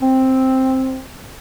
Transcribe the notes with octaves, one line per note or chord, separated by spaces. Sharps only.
C4